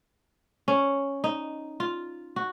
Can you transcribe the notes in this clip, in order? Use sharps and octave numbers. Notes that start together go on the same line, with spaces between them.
C#4
D#4
F4
F#4